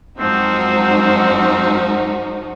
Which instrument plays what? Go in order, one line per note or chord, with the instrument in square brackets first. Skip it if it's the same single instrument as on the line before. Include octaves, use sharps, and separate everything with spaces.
[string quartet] F#2 F3 [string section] G#3 D#4 F#4 [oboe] C4